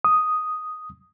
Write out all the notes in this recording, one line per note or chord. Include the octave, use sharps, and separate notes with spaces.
D#6